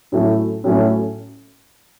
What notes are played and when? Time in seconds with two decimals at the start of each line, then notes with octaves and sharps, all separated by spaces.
0.12 A2 F#3 A3 C#4 E4
0.64 A2 F#3 A3 C#4 E4